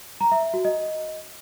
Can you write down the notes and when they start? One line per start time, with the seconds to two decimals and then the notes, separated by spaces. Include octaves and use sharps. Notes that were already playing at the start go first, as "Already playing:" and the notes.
0.21 A#5
0.32 E5
0.43 E5
0.54 F#4
0.65 D#5